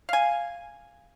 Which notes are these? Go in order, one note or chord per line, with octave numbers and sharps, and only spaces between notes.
F5 G#5